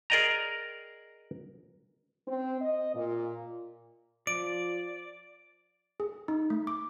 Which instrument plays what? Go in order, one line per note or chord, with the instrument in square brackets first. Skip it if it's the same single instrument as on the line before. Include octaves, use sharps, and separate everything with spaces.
[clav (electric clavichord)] G#4 A#4 D5 D#5 G5 A#5
[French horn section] C4
D#5
A#2
[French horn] F3 [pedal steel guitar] D5 [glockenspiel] D7
[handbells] G#4
D#4
A3
D6